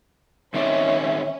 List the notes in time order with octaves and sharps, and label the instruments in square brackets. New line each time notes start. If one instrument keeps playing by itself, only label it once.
[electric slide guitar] D#3 C4 D5 [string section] C#4 [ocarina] E5